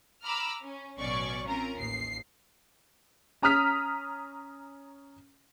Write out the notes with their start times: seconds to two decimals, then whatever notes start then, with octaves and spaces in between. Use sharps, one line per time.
0.24 A#5 B5 D6 E6 F6
0.62 C#4
0.99 A1 B2 F#3 C#4 D5 C#6
1.46 C4 C#4 F4 A#4 A#5
1.75 A1 D#2 C7
3.42 C#4 A#5 D#6 F6 B6